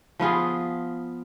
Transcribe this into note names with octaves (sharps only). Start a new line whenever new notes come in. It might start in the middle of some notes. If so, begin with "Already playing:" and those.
F3 B3 F4 G#4